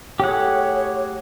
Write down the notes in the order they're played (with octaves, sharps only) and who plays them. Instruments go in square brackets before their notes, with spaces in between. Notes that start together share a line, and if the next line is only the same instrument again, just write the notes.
[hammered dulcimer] A2 F#3 G#4 [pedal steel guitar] G4 F#5 [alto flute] C#5